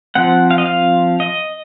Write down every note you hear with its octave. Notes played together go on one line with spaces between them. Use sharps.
F3 C4 F#5
F5
D#5
F5
D#5